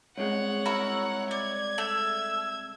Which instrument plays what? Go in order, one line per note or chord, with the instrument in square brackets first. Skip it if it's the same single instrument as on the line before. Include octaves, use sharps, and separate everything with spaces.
[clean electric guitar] C2 G#3 [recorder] C#5 [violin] F#5
[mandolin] E4 F#4 A#4
[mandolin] D5 [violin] G#6
[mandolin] A3 [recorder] E6